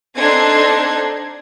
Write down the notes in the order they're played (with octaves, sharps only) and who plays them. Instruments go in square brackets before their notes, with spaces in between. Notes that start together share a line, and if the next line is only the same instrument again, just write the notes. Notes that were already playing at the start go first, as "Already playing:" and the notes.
[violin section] C4 D4 D#4 A4 C6 G#6